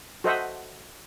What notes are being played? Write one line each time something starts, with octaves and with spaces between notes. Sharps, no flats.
F#4 A4 C5 D#5 E5 F#5